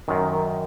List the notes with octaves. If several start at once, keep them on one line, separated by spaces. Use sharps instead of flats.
F#2 D#3